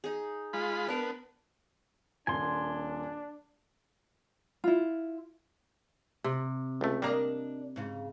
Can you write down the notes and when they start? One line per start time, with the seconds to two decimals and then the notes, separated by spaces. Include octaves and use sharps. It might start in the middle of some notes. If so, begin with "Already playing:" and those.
0.04 D#4 G#4
0.53 G#3 F4 B5
0.88 B3 D4 A#4
2.27 D#1 A#3 D4 G#5 C6
4.64 E4 F4
6.24 C3
6.81 C#2 A3
7.02 G3 A#3 D4 A#4 D#5
7.76 G#2 C#3